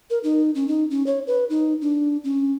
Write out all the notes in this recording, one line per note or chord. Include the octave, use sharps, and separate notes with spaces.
A#4
D#4
C#4
D#4
C#4
C#5
B4
D#4
D4
C#4